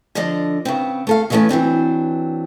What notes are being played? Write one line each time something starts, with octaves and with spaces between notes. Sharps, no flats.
D3 F3 D4 D5 D#5
C#3 B3 C4
A3 A4 F5
C#3 E3 G3 A3 B3 C#4
E3 F#3 C4 D4